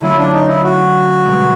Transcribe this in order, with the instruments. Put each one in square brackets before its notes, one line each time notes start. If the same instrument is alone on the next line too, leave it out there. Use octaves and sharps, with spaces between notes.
[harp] D3 F#3 A3 C#4 F4 [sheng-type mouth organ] E4
[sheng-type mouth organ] D4
D#4
E4
F#4
[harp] C2 B2 G#3 B3